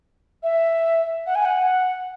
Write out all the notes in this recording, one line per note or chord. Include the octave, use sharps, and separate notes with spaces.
E5
F#5
G#5
F#5